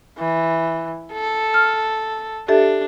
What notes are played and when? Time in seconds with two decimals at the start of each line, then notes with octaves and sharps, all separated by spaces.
0.19 E3
1.13 A4
1.54 F6
2.48 D4 G4 A4 E5